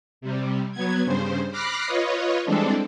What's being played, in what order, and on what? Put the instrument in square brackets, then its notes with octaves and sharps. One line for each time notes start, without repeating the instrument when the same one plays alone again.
[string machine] C3 G3
F#3 B3 G#6
G2 C#3 C5
B5 D6 F6 F#6 A#6 C7
F4 B4 C#5 D#5
E3 G3 G#3 C4 D4 A4